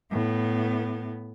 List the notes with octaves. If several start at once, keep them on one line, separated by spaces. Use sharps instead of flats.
A2 B3